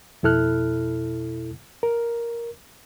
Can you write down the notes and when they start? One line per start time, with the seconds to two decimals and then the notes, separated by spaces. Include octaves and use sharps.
0.23 F2 B2 E4 A4 F6 F#6
1.83 A#4